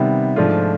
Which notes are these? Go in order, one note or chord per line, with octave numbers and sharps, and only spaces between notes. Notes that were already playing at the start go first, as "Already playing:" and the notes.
Already playing: C3 D#3 G3 B3
G#2 F3 A3 D4 F4